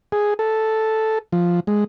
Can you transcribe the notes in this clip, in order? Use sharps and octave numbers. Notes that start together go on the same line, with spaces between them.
G#4
A4
F3
G#3